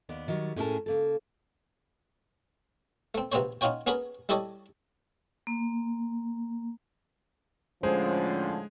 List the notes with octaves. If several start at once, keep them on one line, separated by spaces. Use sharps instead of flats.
D#2 B3 D5
D#3 F#3 G3
A2 C#4 D#4 G#4 A#4 A5
C#3 A#3 A4
A3 C4
A#1 C3 B3 C4 C5 C#5
C#4 D#4 F4 F#4 C#5 G5
B3 C#4 F#4 G#4 A#4 B4
G3 E4 G4 A4 C#5 D#5
A#3
A2 D3 F3 G#3 C#4 G#4 C5